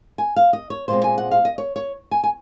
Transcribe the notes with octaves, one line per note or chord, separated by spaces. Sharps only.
G#5
F5
D#5
C#5
A#2 G#3 C4 C5
G#5
F#5
F5
D#5
C#5
C#5
G#5
G#5